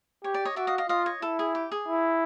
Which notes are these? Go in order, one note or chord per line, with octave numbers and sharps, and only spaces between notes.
G4 C#5
D5
C#5 D#5
F#4 D5 E5
D#5 F5
D#5 F5
F4 D#5 F5
C#5 D#5
E4 A4
G#4
G4
G#4
E4